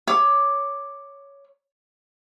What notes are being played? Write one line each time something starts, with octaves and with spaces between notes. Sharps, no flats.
C#5 D6